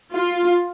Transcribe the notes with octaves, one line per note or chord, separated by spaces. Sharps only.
F4